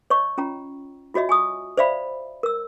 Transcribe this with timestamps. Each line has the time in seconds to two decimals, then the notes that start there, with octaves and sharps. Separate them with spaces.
0.10 C#5 D#5 C#6
0.38 C#4 F4 G5 A#5
1.14 F4 F#4 C#5 D#5 E5
1.29 G#5 C#6 D#6
1.77 C5 D5 E5 F5 B5
2.43 A#4 E6